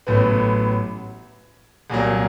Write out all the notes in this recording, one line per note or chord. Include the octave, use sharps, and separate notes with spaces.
A1 A2 F#3 B3
C2 A#2 F#3 A#3